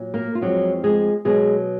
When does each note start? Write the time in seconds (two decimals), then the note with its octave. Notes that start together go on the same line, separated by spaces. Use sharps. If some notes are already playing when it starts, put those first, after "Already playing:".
Already playing: A#2 F#3
0.14 A#3 A#4
0.35 F4
0.41 F2 F3 F#3 G#3 F#4
0.84 G#3 G#4
1.25 B2 F#3 G#3 G#4